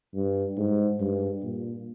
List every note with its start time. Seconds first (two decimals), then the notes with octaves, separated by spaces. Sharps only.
0.15 G2
0.57 G#2
1.00 G2
1.43 A#2